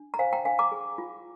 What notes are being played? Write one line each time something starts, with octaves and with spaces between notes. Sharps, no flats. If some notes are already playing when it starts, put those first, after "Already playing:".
Already playing: D4
A#5
C5 F5 G#5
G5 A#5
D4 F5 G#5
A#5 D6
G#4
F4